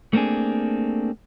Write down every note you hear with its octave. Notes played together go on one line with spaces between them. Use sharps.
A3 A#3 C4 D4 G#4